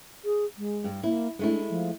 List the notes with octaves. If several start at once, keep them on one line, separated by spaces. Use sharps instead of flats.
G#4
G#3
G2
A#3 E4
G#3 A3 D4 E4
F3